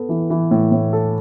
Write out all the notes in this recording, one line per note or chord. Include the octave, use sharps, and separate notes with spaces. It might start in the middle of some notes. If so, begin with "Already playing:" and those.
Already playing: B3 A4
E3
E3
A2
A2
A4